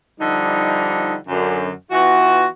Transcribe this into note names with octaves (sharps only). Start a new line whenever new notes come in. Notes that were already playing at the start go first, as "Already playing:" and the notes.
D3 F3 G3 D#4
F#2 D3
E3 B3 F4 F#4